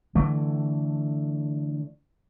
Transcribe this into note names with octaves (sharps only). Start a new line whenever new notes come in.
D3 E3 A3